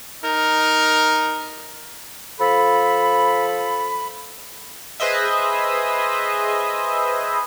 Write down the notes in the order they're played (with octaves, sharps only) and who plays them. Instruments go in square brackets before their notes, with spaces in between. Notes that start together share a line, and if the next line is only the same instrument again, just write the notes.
[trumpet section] D#4 A#4
[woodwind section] F3 A4 B5
[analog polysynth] G#4 B4 C5 D#5 E5